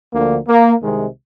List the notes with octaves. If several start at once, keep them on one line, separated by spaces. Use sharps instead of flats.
D2 D3 F3 A#3
A#3
C2 C3 D#3 G#3